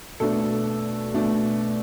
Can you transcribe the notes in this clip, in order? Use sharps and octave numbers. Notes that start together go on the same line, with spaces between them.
B2 A3 D4 A4
B2 A3 D4